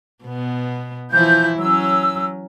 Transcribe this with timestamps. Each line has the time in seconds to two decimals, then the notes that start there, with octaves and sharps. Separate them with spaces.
0.25 B2 B3
1.11 E3 F3 E4 G6
1.58 F#3 C#4 E6